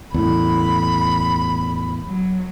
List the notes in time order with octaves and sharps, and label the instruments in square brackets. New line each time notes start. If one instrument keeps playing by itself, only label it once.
[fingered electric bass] E2 A2 [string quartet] B5
[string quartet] F#3